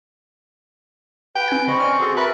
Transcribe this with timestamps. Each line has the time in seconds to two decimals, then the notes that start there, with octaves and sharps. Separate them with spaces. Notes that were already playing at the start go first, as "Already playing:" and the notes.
1.36 B4 G5
1.48 C4 G#5 G#6
1.68 C#3 C4 D#5 B5 C#6
1.79 C#4 D5 G#5 F6
2.00 F#4 G#4 A4 C6 A6
2.17 A#4 B4 E5 G#5 B5 F#6 A6